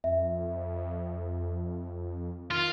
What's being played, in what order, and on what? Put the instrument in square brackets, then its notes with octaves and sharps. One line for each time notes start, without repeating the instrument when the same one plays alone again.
[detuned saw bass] F2 [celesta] E5
[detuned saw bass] D#3 [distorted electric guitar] F4